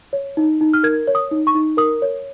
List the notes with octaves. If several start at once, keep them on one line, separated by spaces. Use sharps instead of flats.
C#5
D#4
D#4
F6
A#4 G#6
C#5
D#6
D#4
C#6
D#4
A#4 D#6
C#5